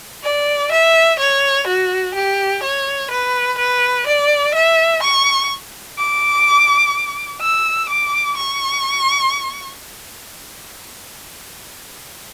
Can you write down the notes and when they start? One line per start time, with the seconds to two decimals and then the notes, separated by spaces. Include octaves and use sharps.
0.23 D5
0.72 E5
1.19 C#5
1.67 F#4
2.15 G4
2.63 C#5
3.11 B4
3.58 B4
4.07 D5
4.54 E5
5.02 C#6
5.98 D6
7.41 E6
7.89 D6
8.37 C#6